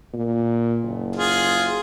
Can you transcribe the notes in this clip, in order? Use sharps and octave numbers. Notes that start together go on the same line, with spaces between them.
A#2
F#1
F4 G#4